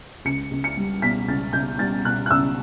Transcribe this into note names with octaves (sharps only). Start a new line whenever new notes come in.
C#2 C#7
C#2
C#7
G3
B2 B6
C#2 A6
C#2 G6
G3 A6
B2 F#6
F#6
C#2 E6